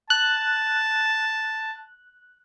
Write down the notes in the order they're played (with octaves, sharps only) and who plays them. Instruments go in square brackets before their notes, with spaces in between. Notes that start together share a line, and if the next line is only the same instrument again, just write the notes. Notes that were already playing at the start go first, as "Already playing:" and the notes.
[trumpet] A5 [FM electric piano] F#6